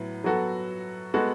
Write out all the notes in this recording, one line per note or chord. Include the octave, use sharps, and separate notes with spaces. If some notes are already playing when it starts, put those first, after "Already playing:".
Already playing: A2 F#3 B3
F#3 B3 F#4 A4
G#3 B3 F#4 A4